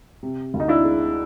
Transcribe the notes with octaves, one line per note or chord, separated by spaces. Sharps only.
C3
D2
D#4
D4 E4
G#3